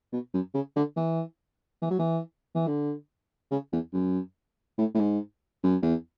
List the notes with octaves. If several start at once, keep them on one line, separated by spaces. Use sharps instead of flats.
B2
F#2
C#3
D3
E3
E3
F#3
E3
E3
D3
C#3
E2
F#2
A2
A2
G#2
F#2
E2